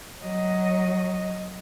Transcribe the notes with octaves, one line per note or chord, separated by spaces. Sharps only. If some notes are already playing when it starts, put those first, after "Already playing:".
F#3 D#5